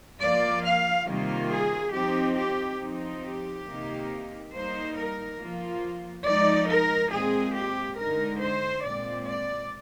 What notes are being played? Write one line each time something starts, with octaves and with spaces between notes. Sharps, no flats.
F3 A#3 F4 D5
F5
C3 D#3 G3 A#3 F4
G#4
F3 C4 D#4 G4
G4
F3 C4 D#4
G4
C3 D#3 A#3 D#4
G3 A#3 D#4 C5
A#4
F3 A#3 F4
F3 G#3 D#4 D5
A#4
A#2 G#3 C4 G#4
G4
D3 G#3 D#4 A#4
C5
A#2 G#3 C4 D5
D5